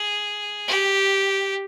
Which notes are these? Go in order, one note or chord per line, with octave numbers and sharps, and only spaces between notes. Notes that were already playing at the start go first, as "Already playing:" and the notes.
Already playing: G#4
G4